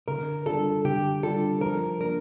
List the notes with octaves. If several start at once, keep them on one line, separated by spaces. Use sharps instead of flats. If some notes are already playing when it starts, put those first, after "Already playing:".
D3 A#4
G3 D4 F4 A4
D3 G4
G3 D4 F4 A4
F3 A#4
A#3 D4 A#4